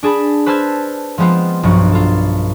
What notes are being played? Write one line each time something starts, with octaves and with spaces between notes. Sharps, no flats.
D4 G#4 A5 B5
B4 C5 A5 E6 F6 G#6
F3 G#3 B3 C4 F4
B1 G2 F3 F#4
F4 A4